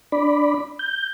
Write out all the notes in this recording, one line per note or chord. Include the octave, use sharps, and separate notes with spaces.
D4 D5 B5
G6